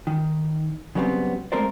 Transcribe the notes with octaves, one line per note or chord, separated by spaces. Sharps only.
D#3
C#3 F#3 G3 A3 B3 C4
G#3 A3 C4 A#4 C5 D5